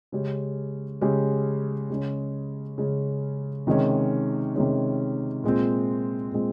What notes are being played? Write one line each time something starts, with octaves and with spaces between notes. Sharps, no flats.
C#3 G#3 C#4 G4
C#3 G#3 C#4 G4
C#3 G#3 C#4
C#3 G#3 C#4
C3 D#3 G#3 C#4
C3 D#3 G#3 C#4
A#2 G#3 C4
A#2 G#3 C4